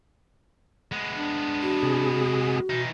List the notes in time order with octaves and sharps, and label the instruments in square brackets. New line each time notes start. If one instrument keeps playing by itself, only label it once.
[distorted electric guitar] G#3 B3
[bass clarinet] D4
[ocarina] F#4
[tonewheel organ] C3 G#4
[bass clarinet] B2 [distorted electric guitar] E3 D#4